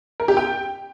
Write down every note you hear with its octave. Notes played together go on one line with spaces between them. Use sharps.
A#4
G4
G5